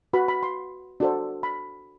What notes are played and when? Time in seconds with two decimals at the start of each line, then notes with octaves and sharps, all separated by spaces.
0.13 F#4 B4 B5
0.28 B5
0.43 C6
1.00 D4 F#4 A4 C5
1.43 B5